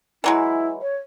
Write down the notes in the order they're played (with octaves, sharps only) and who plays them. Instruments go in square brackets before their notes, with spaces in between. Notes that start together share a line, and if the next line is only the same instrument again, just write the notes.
[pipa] E3 F#3 G#3 [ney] E4
[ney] C#5